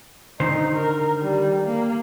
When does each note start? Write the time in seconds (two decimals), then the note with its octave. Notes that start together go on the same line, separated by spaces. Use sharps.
0.40 D3 D#3 D#4 C5
0.76 A#4
1.21 G3
1.64 A#3